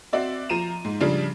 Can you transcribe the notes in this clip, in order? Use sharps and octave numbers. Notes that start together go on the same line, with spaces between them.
C4 F#4 D5 E5
F3 A#5 D#7 E7
G#2
C#3 F3 G3 D4